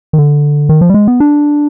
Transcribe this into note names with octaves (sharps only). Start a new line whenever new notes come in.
D#3
D3
D#3
F3
G3
G#3
B3
D4